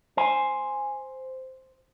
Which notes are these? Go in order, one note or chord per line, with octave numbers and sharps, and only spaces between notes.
C5 G#5